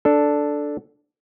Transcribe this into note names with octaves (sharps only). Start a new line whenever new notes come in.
D4 A4